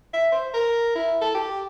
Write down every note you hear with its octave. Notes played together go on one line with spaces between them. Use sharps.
E5
C5
A#4
E4
A4
G4